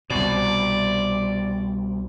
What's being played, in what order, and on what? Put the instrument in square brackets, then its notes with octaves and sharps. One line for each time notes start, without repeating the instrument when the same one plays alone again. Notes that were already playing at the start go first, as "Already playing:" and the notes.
[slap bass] C2 B2 [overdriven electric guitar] D5